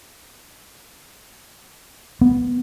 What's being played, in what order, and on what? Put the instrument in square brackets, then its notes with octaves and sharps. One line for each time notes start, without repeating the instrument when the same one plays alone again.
[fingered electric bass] B3